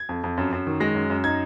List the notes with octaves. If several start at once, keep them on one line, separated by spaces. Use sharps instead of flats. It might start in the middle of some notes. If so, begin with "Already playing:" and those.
Already playing: G#6
F2
F2
F#2
F#2
D#3
G#3 A#6
F#2
F#2
D#4 G#6